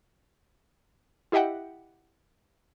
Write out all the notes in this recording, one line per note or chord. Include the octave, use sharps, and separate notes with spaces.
E4 G4 D#5 E5 F#5 G5